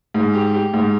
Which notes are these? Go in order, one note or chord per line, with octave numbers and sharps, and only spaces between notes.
G#2
G4
G4
G#2